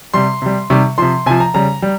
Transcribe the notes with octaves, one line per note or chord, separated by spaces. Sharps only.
C3 G3 C6
C3 G3
C3 D#3 G3 C#6
C3 F3 C6
C3 F3 G#5
A#5
C#3 G3 A#5
G3